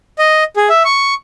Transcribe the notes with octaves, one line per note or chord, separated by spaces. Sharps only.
D#5
G#4
E5
C#6